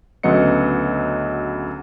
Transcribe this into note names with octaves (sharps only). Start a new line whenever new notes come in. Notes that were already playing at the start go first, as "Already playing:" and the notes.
D2 C#3 F#3 B3 D#5 C#7